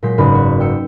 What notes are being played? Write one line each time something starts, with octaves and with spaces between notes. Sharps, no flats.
A#2 F#3 G#3 G6 B6 C7
F#1 G#2 D#4 B4 D5 B5
F#4
G5 E6 C#7